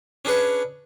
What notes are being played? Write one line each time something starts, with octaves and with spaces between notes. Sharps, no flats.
C#4 D4 G#4 B4 C#5